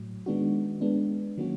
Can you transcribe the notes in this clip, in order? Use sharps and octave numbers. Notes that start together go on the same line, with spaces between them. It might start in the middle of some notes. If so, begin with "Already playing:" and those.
Already playing: A2 F#3
D#3 G#3 B3 D4 F#4
G#3 B3 D4
D#3 F#3 A#3 C#4 F#4